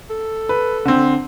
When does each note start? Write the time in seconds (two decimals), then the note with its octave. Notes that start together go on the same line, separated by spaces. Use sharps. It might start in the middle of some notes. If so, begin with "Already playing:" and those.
0.10 A4
0.49 B4
0.85 D3 C4